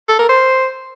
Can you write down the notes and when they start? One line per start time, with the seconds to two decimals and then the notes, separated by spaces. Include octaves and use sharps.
0.08 A4
0.19 A#4
0.29 C5